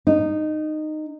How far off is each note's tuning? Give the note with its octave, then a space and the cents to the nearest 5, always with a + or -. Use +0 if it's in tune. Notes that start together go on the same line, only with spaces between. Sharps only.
D#4 -15